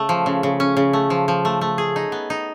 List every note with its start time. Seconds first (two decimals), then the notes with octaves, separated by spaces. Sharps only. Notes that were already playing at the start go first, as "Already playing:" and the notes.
Already playing: C#3 A3
0.09 F3
0.26 C#3
0.43 C#3
0.60 C#4
0.77 C#3
0.93 A3
1.10 F3
1.28 F3
1.45 A3
1.61 A3
1.78 G#4
1.96 D#4
2.12 B3
2.30 D#4